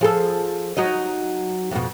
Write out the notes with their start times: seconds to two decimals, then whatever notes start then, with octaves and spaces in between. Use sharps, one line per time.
0.01 F3 G#4 A4
0.77 F#3 D#4 D#5
1.71 F2 G#2 B2